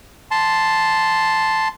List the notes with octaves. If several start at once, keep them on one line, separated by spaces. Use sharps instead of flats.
A5 C6